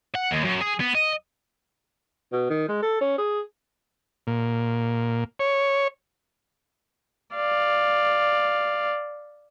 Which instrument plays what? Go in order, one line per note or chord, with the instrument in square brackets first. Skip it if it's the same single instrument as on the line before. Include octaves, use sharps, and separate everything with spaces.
[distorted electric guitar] F#5
D#2
F#2
G#4
B3
D#5
[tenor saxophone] B2
D#3
G#3
A4
C#4
G#4
[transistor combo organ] A#2
C#5
[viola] D5 F5